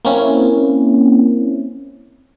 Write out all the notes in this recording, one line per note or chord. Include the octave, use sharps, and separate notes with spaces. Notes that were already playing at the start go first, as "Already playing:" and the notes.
A#3 C4 C#4 E4